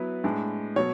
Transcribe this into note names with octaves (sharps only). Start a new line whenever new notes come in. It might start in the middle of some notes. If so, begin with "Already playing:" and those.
Already playing: F#3 B3 E4 B4
A2 G#3 D4
B2 F#3 C#5